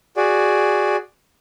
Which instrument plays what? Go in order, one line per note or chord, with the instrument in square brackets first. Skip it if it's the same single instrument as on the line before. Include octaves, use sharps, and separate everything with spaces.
[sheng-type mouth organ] F#4 G#4 D5